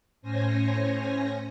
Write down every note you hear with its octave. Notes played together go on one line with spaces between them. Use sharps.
A2 C#4 C5 C#5 G#5 A#6